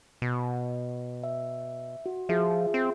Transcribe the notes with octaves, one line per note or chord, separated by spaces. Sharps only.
B2
E5
F#4
F3 F4 G#4 E5
C4